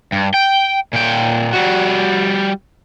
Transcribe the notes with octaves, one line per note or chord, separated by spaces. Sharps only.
G2
G5
A#2 G5
G3 F#4